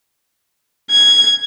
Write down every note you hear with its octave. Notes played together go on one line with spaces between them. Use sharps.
G#6